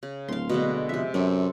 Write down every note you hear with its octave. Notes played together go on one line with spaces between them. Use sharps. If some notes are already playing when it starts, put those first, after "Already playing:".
C#3
D1 F5 C6
B2 D3 G#3
F2 C3 E5
F#2 C4 A4